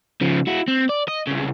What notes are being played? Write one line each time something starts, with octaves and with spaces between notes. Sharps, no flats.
C#3 F3
E4 F#4
C4
D5
D#5
C2 C#3